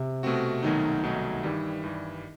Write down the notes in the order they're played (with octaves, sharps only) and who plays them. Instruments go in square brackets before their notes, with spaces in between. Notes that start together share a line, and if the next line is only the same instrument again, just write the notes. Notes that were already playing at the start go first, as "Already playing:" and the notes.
Already playing: [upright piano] C3
[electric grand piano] B2 A3 C4 F#4
[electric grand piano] C2 B2 F#3 A3 D#4 [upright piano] D#3
[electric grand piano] C2 B2 F#3 A3 D#4
[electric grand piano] G2 E3 G3 [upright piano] D#3
[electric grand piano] G2 E3 G3